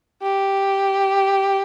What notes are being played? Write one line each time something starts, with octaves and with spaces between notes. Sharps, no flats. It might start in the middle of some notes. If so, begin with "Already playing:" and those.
G4